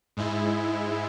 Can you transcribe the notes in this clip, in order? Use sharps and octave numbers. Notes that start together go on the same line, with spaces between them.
G#2 G#3 E4